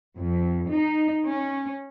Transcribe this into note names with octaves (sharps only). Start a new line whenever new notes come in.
F2
D#4
C#4